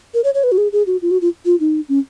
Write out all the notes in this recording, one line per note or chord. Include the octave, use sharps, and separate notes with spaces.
A#4
C#5
C#5
B4
F#4
G#4
G#4
F#4
F4
F#4
F4
F4
D#4
C#4